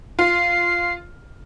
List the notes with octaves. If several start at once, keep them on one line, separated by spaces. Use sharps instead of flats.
F4 C7